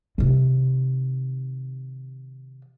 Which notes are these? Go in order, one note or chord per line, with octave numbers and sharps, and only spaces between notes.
C3 D#3